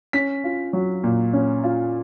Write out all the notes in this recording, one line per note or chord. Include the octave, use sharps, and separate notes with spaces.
C#4 B6
F4
F#3
A#2
C#4
F4